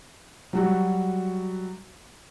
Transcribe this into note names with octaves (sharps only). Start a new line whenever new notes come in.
F#3 G3 F#4